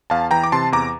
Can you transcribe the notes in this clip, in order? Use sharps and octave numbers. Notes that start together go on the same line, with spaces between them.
E2 F5 A5
E3 G5 A#5
D6
C3 A5 C6
E2 A#5 D6